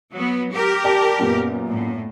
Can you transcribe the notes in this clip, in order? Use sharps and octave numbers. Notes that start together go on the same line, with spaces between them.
F#3 B3
G4 A#4
D5 G5 A5
F#2 A#2 B3
A2